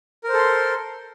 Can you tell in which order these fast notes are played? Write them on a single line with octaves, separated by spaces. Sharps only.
A#4 C5 A4 C6